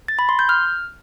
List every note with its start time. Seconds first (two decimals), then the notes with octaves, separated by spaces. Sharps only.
0.08 A6
0.19 B5
0.29 C6
0.39 G6
0.49 F6